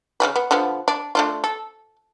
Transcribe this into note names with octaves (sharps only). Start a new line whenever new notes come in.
C#3 G3 B4
B3
D3 F3 B3
D4
A3 D4 F4
A4